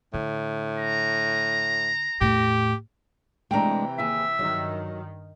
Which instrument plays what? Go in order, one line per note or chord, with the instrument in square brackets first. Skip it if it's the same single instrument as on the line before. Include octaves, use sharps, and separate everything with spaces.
[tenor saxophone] A2 [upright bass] D3
[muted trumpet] A#5
[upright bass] E2 A2 [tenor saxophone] G4
[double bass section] C3 E3 [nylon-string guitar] G#3 A3 D4 [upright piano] G5 A#5
[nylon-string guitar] D#2 G#4 [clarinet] E5
[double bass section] G2 D#3 [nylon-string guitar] F#3